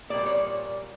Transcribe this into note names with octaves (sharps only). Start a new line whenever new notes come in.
A#2 G3 A#3 D5
C#5